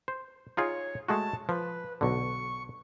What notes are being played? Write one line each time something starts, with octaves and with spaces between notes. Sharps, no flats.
C5
D#4 F4 G#4 C#5
G#3 A3 F#4 A5
F3 B4
B1 D3 C#6